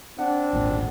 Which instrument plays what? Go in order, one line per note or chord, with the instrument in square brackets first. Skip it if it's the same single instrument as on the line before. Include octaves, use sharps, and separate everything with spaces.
[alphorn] C4 [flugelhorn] D4 [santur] F#5
[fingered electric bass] D1 G#1 A#2